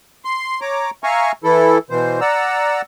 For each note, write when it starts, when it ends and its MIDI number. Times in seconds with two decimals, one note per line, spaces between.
0.25 0.60 84
0.61 0.90 73
0.61 0.90 82
0.61 0.90 86
1.04 1.32 76
1.04 1.32 77
1.04 1.32 80
1.04 1.32 82
1.04 1.32 85
1.44 1.78 52
1.44 1.78 64
1.44 1.78 69
1.90 2.20 47
1.90 2.20 52
1.90 2.20 72
2.21 2.82 74
2.21 2.82 78
2.21 2.82 82
2.21 2.82 88